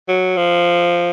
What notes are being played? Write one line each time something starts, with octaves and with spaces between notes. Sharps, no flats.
F#3
F3